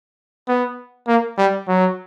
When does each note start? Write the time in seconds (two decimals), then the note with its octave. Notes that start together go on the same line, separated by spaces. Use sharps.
0.48 B3
1.08 A#3
1.38 G3
1.68 F#3